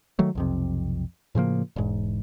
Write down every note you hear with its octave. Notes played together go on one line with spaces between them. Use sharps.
D#3 F#3 A3
B1 F2 C3
A2 C#3 F3 A#3
E1 G#2